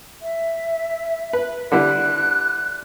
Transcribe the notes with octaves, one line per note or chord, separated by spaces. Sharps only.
E5
B4
D3 G3 E4 F#6